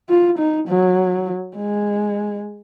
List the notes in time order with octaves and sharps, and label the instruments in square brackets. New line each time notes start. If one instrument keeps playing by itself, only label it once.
[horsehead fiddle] F4
D#4
F#3
G#3